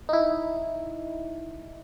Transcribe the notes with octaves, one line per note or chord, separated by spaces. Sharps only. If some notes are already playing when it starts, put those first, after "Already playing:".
D#4 E4